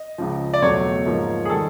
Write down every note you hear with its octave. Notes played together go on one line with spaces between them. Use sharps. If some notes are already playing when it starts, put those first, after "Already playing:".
Already playing: D#5
C#2 C#3 F3
D5
E2 B2 F#3 A3 C#5
G#2 F3 A#3
G#4
D#3 G3 A4